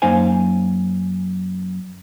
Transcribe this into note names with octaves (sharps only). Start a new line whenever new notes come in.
F#2 A#3 D#4 C5 F5 G#5